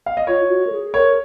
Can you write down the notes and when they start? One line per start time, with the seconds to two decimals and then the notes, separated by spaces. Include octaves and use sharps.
0.06 F5
0.17 D#5
0.27 F4 C#5
0.44 F4
0.50 F#4
0.67 A#4
0.72 G#4
0.94 A#4 C#5